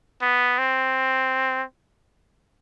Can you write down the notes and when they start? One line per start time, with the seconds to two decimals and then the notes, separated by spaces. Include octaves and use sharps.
0.22 B3
0.58 C4